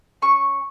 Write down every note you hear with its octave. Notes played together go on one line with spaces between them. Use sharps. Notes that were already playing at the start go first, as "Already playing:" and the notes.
C#4 C#6